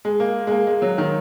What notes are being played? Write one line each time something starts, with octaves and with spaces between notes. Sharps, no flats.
G#3
A#3
G#3
A#3
G#3
F#3
D#3